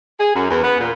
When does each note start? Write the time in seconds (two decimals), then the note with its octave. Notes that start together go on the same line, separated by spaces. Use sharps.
0.20 G#4
0.36 F#2
0.50 E2
0.64 B3
0.80 A#2